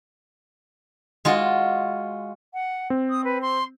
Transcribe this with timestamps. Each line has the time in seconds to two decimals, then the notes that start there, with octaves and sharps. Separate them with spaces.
1.25 G#3 F4 F#4
2.54 F#5
2.90 C4
3.10 D#6
3.24 B4
3.42 C6